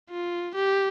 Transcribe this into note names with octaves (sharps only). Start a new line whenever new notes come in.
F4
G4